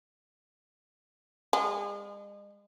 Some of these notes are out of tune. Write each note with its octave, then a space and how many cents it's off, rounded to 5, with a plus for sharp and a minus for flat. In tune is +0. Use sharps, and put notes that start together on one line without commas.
G#3 -40